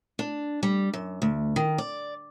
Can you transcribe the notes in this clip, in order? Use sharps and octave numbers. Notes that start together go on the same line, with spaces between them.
D4
G3
F#2
D2
D#3
D5